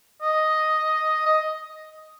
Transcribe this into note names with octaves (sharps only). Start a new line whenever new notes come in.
D#5
D#5